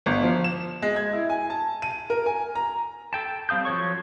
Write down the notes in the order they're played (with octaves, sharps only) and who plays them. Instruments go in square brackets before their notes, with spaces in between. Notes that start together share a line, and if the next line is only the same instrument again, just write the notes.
[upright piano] G1
F3
E7
G#3
G#6
E4
G#5
A5
D#7
A#4
G#5
A#5
[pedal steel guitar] A4 G5 A5
G3 C4 F5 D#6 G6
F3 F#3 A4 C#5 C#6